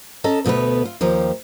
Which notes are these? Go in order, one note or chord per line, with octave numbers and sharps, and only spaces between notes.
C#4 A4 D#5 A#5
D2 B2 A3 B3 B4
F4
D#2 F3 G4 A#5